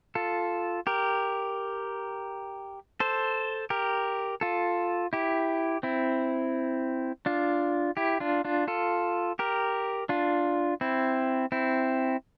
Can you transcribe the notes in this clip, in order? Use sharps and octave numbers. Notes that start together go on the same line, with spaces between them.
F4 A4
G4 A#4
A4 C5
G4 A#4
F4 A4
E4 G4
C4 E4
D4 F4
E4 G4
D4 F4
D4 F4
F4 A4
G4 A#4
D4 F4
C4 E4
C4 E4